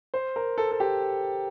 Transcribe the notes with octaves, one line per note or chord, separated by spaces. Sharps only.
C5
A#4
A4
A4
G4